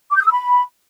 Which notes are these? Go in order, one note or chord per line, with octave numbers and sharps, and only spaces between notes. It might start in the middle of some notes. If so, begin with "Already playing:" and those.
D6
G6
D#6
E6
B5